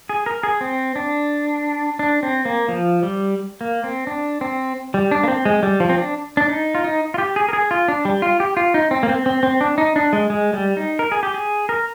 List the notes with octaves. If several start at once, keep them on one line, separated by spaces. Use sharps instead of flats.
G#4
A#4
G#4
C4
D4
D4
C4
A#3
F3
G3
A#3
C4
D4
C4
G3
D4
A#3
C4
G#3
G3
F3
C4
D4
D4
D#4
F4
D#4
F4
G4
G#4
A#4
G#4
F4
D4
G3
F4
G4
F4
D#4
C4
A#3
C4
C4
C4
D4
D#4
D4
G#3
G#3
G3
D#4
A#4
G#4
G4
G#4
A#4